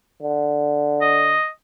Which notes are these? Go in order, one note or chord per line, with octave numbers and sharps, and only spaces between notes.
D3
D#5